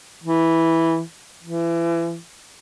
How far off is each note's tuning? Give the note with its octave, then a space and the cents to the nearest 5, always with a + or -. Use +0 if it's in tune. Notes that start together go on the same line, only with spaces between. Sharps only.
E3 -5
E3 +30